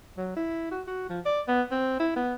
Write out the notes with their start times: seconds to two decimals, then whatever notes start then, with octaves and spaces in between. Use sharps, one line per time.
0.17 F#3
0.36 E4
0.71 F#4
0.87 F#4
1.09 F3
1.26 D5
1.48 B3
1.71 C4
2.00 E4
2.16 B3